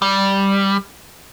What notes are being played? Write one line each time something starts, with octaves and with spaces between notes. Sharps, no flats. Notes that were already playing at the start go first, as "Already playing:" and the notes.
G3